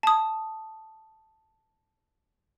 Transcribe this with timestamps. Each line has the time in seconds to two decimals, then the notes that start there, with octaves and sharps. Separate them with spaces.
0.03 A5 D#6